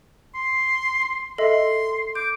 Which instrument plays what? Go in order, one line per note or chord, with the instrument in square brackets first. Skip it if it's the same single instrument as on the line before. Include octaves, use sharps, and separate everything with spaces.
[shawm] C6
[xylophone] C7
[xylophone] A4 D#5 E5 [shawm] C6
[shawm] D6 [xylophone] G6